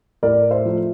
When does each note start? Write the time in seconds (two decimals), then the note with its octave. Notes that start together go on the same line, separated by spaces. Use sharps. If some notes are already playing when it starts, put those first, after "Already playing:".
0.23 A2 A#4 D5
0.51 C5 E5
0.65 F3 A3